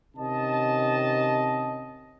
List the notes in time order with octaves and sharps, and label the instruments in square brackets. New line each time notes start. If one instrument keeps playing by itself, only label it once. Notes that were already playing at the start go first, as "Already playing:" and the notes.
[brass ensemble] C3 D#3 C#4 D#5 A5